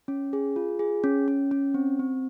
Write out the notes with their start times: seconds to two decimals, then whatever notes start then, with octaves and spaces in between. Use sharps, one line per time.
0.08 C#4
0.33 G#4
0.56 F4
0.79 G#4
1.04 C#4
1.28 C#4
1.51 C#4
1.74 C4
1.99 C4